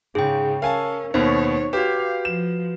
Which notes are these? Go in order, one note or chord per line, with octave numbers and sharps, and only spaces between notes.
G#2 C#3 G#4 G5
C#4 A#4 F5 G#5 A5
D#2 B2 D#4 C5 C#5
F#4 G4 B4 F5
F3 E7